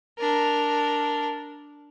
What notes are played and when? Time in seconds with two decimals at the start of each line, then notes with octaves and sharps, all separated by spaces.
0.19 D4 A#4